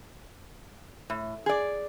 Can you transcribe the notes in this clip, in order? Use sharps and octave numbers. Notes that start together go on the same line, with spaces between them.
A2
G#4 D5